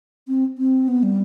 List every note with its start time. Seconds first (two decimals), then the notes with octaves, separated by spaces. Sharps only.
0.28 C4
0.58 C4
0.88 B3
1.03 G3